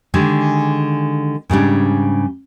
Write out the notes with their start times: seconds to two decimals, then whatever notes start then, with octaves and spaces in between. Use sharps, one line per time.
0.14 D3 D#3 G#3 G4 G#4
1.49 G#2 C#3 G3 D4